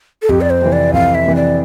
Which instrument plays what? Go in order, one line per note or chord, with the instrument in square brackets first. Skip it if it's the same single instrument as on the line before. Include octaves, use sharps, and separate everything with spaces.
[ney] A4
[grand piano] F2 [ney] G4
[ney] D5
C5
[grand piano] C3 E3
[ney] D5
[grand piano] F2 [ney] F5
[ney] E5
[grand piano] C3 E3
[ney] D5